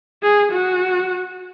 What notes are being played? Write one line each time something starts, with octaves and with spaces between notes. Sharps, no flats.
G#4
F#4